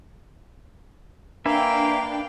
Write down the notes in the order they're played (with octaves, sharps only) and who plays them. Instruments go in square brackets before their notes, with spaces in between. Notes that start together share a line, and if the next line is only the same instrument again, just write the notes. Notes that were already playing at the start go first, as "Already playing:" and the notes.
[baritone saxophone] A#3 [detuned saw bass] D4 [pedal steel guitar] B4 E5 G#5 [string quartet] F5 G5